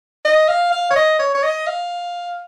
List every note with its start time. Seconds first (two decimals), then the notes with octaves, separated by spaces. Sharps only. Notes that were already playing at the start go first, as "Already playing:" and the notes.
0.25 D#5
0.49 F5
0.72 F5
0.91 C#5
0.96 D#5
1.19 C#5
1.35 C#5
1.43 D#5
1.67 F5